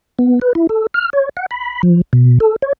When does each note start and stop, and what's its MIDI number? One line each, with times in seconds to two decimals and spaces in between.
0.19 0.40 59
0.42 0.53 71
0.55 0.67 64
0.69 0.87 69
0.94 1.10 89
1.13 1.29 73
1.37 1.46 78
1.51 1.82 83
1.83 2.01 53
2.13 2.39 47
2.40 2.56 69
2.62 2.73 73